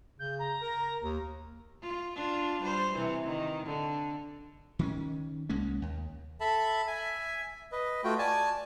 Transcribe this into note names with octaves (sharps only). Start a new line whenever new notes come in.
C#3 G6
A#5
A#4
D#2
F4
D4 F4
G3 C5
C3 E3
D#3
D3
D#3 C4 C#4
C2 G#3 A#3 C#4
D#2
A4 E5 A5 B5
E5 G#5
B4 D#5
A3 F4 F#4 G5
D5 G#5 A5